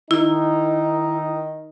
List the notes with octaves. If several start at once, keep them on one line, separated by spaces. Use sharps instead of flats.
D#3 D#4 E4